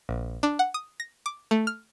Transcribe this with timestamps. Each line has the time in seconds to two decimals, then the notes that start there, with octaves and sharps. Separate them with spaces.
0.09 A#1
0.43 D4
0.59 F#5
0.74 D#6
1.00 A#6
1.26 D6
1.51 A3
1.67 F6